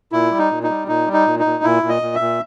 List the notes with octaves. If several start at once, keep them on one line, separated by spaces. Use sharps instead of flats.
A#2 E4
G3
D#4
A#2
D#4
G3
A#2 D#4
G3
D#4
A#2
D#4
A#2
A#2 E4
A#2
D#5
A#2
E5
A#2